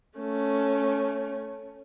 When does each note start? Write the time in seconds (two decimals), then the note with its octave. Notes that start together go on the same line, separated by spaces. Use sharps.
0.18 A3 C#4